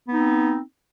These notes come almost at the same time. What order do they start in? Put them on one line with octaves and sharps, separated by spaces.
B3 D#4 C4